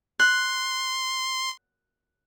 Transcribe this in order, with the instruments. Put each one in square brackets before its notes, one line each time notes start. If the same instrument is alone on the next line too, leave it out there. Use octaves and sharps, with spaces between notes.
[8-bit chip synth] C6 [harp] F#6